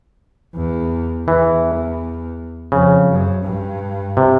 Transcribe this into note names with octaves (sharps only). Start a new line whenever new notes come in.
E2
E2 E3
F2 C#3
F#2
G2
C3